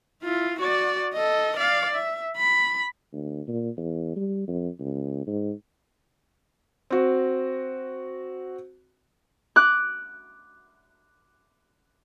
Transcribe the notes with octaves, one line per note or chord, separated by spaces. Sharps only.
E4 F4
F#4 D5
A4 D#5
D5 F5
E5
B5
D2
A#2
E2
G3
F2
C#2
G#2
C4 F#4
D6 F#6